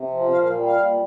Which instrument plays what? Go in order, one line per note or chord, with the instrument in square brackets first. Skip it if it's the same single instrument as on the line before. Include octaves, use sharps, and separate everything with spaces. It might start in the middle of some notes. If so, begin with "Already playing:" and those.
Already playing: [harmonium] C3
F3
A#2 F5
F5
G3
F5
A#2